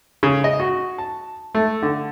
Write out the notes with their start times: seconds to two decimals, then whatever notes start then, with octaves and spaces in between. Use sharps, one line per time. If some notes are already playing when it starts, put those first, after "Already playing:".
0.23 C#3
0.44 D#5
0.60 F#4
0.98 A5
1.55 A3
1.83 D3